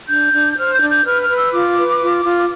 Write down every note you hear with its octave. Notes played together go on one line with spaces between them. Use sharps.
D4 G6
D4
C5 F6
G6
D4
G6
B4 F6
F6
B4
E6
F4 D6
B4
F4
F4